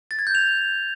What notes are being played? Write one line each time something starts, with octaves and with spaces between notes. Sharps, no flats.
A6
G#6
G6
F7